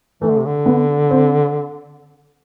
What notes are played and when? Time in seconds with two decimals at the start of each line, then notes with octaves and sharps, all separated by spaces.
0.22 E3 A3
0.30 D3
0.38 C3
0.46 D3
0.66 B3
1.10 C4